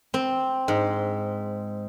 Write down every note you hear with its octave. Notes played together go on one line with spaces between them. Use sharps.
C4
G#2